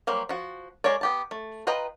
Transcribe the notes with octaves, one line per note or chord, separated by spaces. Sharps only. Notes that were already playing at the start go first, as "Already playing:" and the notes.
F#3 G3 A#3 C5
F3 F#4
G#3 F#4 A#4 C#5 D5
B3 G4 A5
A3
F4 B4 D#5 G5 A#5